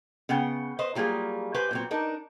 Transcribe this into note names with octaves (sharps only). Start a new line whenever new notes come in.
C#3 B3 F#5 G5
B4 C5 D#5
F#3 G3 A#3 F4 G#4
G4 B4 C5 G#5
A#2 F#3 C4
D4 D#4 A#4